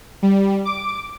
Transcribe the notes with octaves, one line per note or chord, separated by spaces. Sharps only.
G3
D6